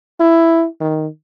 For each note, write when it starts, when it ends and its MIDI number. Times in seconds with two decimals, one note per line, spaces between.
0.20 0.66 64
0.81 1.07 51